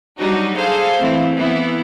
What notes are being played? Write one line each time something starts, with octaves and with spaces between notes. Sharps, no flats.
F#3 G3 D4 D#4 F#4
G#4 A4 C5 F5
E3 A3 C4 E4
E3 B3 E4